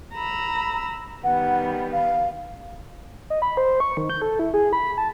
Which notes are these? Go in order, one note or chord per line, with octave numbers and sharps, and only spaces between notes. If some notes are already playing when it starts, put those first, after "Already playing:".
A#5 B5 E6
D#3 G3 B3 F#5
F5
D#5
B5
C5
C#6
D#3
G6
A4
E4
G#4
B5
A5